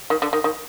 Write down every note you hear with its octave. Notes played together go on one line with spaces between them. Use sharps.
D#3
D3
D#3
D#3